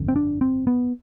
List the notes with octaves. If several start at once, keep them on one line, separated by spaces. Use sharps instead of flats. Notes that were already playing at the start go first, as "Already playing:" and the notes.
Already playing: G1 F2 D3
C4
D4
C4
B3